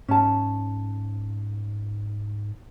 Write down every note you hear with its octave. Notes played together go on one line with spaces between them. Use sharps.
G#2 C#4 A5